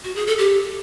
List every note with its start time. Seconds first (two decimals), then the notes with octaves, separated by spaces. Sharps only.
0.04 F#4
0.16 G#4
0.27 A4
0.38 G4